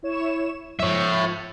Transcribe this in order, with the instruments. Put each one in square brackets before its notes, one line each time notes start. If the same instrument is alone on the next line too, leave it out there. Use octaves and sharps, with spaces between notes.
[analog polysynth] E4 C#5 E7
[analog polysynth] F3 [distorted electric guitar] C#5 E5